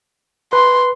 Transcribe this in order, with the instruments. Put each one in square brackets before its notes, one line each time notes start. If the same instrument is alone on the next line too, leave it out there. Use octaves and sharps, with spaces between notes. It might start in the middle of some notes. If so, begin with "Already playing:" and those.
[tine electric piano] B4 [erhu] C6